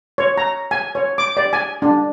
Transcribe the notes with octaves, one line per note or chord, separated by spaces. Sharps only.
C#5
A#5
G#5
C#5
D6
D5
G#5
D4